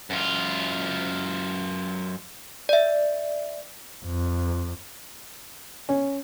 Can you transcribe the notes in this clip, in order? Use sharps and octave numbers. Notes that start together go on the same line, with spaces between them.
F#2 F4
D5 E5
F2
C#4